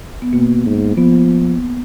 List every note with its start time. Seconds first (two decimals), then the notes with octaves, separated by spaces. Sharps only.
0.22 B3
0.33 B2 A#3
0.66 G#2
0.97 F3 B3